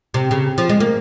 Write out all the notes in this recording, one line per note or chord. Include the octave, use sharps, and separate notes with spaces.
C3
C#3
F3
G#3
A#3